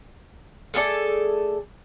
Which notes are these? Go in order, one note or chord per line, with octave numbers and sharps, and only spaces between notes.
A3 G#4 A4 D5